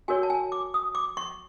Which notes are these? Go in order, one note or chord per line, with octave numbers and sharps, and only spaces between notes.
F#4 A#4 C#5 G#5
A5
G#5
D6
D#6
D6
C#6